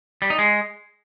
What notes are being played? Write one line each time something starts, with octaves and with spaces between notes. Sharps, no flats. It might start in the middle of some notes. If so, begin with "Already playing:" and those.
G3
D#4
G#3